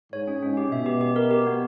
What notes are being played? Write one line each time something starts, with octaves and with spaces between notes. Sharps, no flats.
G#2 C#5
C#4
G#2 C#4
G4
B2 E5
G4
G4
A#4
G4
B3